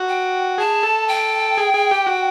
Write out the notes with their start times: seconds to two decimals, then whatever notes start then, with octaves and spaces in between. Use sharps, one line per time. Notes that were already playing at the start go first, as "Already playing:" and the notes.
Already playing: F#4
0.09 G5
0.58 G#4 A5
0.83 A4
1.08 G5
1.58 G#4
1.74 G#4
1.91 G4
2.07 F#4